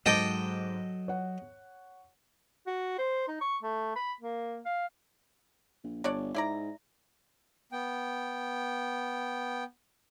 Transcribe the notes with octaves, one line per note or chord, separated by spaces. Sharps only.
G#2 F#3 A4 D#5 G5 D6
C#5 F#5
F#4
C5
D#4
C#6
A3
B5
A#3
F5
A#1
G1 D4 C#5 D5
G#2 E4 D5 A#5
B3 G5